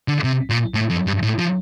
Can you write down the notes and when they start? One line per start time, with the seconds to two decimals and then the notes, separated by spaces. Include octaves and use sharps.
0.08 D3
0.24 C3
0.50 A#2
0.74 A2
0.90 F2
1.07 G2
1.22 A2
1.39 F3